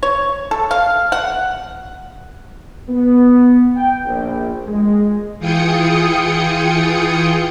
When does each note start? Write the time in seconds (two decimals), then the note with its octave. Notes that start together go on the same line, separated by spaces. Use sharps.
0.03 C#5
0.51 A4
0.71 F5
1.12 F#5
2.88 B3
3.76 G5
4.05 A#1
4.67 G#3
5.39 E3 F4 G#4 G5 D#6 C#7